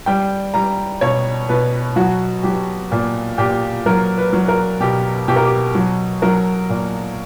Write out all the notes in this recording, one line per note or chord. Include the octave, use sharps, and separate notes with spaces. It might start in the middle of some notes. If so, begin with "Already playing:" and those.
G3 G5
G3 A#5
B2 C#5
B2 B4
F#3 F#4
F#3 G4
A#2
A#2 G4
F#3 A#4
B4
F#3
A#4
B2 G4
B2 G4
A#4
G4
F#3
F#3 A#4
A#2